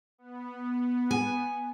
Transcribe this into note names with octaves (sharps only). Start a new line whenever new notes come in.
B3
G#5